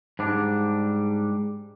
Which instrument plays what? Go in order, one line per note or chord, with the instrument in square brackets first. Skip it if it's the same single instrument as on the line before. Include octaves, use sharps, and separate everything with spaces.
[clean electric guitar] G#2 G3 D4